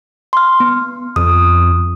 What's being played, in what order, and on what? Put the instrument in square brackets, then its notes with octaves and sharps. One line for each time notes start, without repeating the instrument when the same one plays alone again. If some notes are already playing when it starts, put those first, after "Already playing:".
[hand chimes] C6 F6
B3
[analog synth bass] F2 [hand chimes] D#6